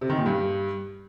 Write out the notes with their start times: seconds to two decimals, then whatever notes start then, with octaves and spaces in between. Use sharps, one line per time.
0.01 C3
0.10 D#3
0.18 A#2
0.26 G2